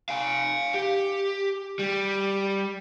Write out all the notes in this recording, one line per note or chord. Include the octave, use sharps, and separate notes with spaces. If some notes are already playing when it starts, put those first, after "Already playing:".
F5 G#5
G4
G3